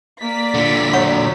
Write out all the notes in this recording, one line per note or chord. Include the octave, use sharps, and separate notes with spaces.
A#3 D5 B6
A#2 D3
F#3 C#5 F#5 C#6